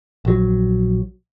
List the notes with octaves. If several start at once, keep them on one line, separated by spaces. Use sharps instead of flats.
A#1 F#3